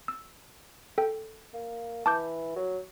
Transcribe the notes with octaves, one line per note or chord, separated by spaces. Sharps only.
E6
A4 G5
A#3
E3 A5 D6 G6
F#3